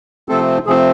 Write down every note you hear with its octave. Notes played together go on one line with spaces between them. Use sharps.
C3 F3 A3 C4 A4
C3 F3 A3 C4 G#4